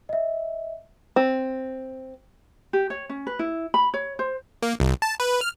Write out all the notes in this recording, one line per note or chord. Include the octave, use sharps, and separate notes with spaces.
D#5 E5
C4
G4
C#5
C#4
B4
E4
B5
C#5
C5
A#3
C2
A5
B4
F6